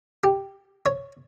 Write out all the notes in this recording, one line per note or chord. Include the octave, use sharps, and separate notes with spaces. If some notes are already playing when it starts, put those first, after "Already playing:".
G4
C#5